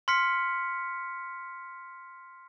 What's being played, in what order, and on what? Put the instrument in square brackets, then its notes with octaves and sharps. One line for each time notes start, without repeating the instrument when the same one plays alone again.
[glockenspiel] C6 F6 B6 C#7